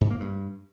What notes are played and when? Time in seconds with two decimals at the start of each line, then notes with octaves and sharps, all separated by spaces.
0.01 G#2
0.11 A#3
0.20 G2